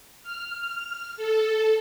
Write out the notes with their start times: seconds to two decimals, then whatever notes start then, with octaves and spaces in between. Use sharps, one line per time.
0.23 F6
1.16 A4